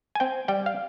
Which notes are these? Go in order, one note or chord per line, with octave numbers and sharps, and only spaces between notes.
G#5
C4 G5
G3 G5
F5